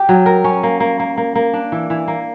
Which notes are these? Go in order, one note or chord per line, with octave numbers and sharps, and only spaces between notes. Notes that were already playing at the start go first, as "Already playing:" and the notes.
Already playing: G4
F#3
A#4
C#4
A#3
A#3
A#3
A#3
A#3
D4
E3
E3
A#3